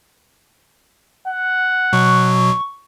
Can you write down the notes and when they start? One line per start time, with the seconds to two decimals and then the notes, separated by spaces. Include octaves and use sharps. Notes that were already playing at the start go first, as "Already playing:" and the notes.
1.27 F#5
1.93 B2 F#3 C#6